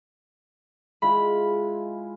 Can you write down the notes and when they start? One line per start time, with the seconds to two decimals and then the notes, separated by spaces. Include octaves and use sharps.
1.02 G#3 E4 F4 B5